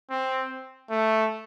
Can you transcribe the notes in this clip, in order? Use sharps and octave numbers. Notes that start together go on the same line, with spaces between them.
C4
A3